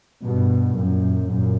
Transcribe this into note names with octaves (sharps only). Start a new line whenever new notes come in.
G2 B2
F#2 A#2
F#2 A#2